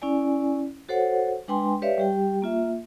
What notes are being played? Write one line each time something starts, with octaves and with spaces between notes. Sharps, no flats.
C#4 E4 D5 G#5
F#4 A4 C5 C#5 F#5
G#3 D4 B4 G5 G#5 C6
G4 B4 C#5 D5 E5 F5
G3 G4 G5
A#3 F4 E5